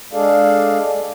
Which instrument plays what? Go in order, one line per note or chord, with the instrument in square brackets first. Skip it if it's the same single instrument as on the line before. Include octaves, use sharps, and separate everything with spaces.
[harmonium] G#3 D4 G#4 A4 D5 F5